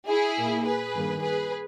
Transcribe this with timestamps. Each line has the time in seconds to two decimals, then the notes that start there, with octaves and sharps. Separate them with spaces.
0.09 E4 G#4
0.38 A#2 A#3
0.66 G#4 B4
0.95 G2 D#3 A#3
1.23 G#4 B4